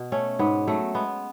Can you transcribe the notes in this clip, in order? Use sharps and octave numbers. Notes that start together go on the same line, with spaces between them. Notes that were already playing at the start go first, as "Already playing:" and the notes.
Already playing: B2
A3 C#4
G#2 B3
F#3 A3
G#3 B3